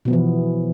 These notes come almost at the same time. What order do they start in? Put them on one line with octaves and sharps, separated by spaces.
B2 B3 F3 E3